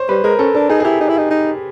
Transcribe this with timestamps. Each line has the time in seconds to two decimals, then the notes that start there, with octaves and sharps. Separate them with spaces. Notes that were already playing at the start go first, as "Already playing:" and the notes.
Already playing: C5 C#5
0.09 G3 B4
0.24 G#3 A#4
0.39 C#4 A4
0.55 D4 A4
0.69 D#4 G#4
0.80 G#4
0.85 E4 G4
1.01 D#4
1.09 E4
1.18 D#4
1.31 D#4